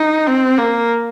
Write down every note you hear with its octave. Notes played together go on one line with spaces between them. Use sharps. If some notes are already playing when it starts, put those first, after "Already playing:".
Already playing: D#4
C4
A#3